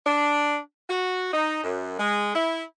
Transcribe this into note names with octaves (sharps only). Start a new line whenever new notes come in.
D4
F#4
D#4
F#2
G#3
E4